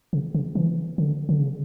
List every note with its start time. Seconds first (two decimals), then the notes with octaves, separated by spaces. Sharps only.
0.13 C#3
0.35 C#3
0.55 E3
0.98 D3
1.29 D3
1.40 C#3